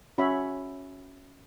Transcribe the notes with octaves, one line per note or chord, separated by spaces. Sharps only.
C#4 F#4 C#5 E5 B5